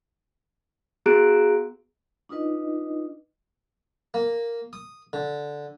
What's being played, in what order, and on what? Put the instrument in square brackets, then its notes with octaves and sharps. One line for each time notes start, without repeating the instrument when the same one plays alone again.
[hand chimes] B3 F#4 G#4 A#5 F#6 D7
[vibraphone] D4 D#4 F4 B4 D#5
[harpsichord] A#3
D#6
D3